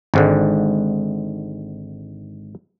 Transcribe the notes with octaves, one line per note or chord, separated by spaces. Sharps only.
G#1 G#2 D3